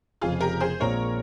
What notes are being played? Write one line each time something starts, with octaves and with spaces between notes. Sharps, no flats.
F1 F2 C#3 F3 F4 G#4
G4 A#4
G#4 C5
A#1 A#2 G#3 C4 A#4 C#5